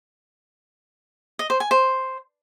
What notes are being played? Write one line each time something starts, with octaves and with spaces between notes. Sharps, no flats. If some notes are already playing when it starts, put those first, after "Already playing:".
D#5
C5
G#5
C5